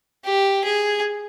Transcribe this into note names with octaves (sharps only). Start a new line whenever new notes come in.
G4
G#4